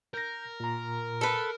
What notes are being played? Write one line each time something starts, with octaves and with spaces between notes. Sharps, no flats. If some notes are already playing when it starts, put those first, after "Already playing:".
A#4 G6 A#6
A#2 A#5
A4 B4